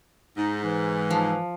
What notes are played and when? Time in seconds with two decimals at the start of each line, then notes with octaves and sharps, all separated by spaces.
0.37 G#2 D#4
0.64 E3
1.10 F3